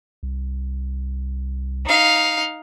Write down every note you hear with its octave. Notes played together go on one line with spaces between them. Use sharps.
C2
D#4 F5